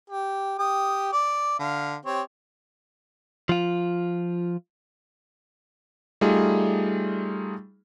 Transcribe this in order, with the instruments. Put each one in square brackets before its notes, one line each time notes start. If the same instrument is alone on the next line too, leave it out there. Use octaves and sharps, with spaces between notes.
[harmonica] G4
G4 D#6
D5
D3 F5
C4 G4 C#5
[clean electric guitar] F3 F4
[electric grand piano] G3 A3 D#4 F4 G#4